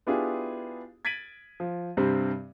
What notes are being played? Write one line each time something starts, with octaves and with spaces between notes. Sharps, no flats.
B3 D4 E4 F4 G4 G#4
G#6 A6 B6 D7 D#7 F#7
F3
G2 C3 G3 C4